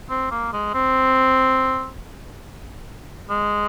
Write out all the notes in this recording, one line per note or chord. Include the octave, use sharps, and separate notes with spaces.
C4
A#3
G#3
C4
G#3